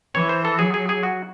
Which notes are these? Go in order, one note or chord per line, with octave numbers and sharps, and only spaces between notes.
E3 C#5
C5
A4
F#3 G#4
G#4
G#4
F#4